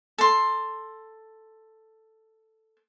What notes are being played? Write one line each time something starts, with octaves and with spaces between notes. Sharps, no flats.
A4 C6